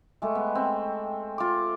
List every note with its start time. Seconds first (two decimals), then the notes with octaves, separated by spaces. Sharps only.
0.22 G#3 A3 G4
0.35 B3
0.55 C4
1.38 F4 D6